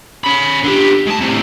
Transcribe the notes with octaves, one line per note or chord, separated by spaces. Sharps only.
C#4 B5
D3 G4
G#2 A5
A2 C3